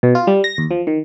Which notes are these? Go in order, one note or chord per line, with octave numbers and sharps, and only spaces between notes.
B2
F4
G3
A#6
D#2
F3
D#3